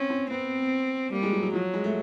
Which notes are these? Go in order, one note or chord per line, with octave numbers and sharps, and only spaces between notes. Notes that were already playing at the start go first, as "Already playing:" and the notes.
Already playing: C4 C#4
C4
B3 C4
G3 A#3
G#3
F#3
F#3
F3 F#3
G#3
A3